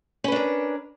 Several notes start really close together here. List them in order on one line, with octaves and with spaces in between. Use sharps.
C#4 B4 D4 A#4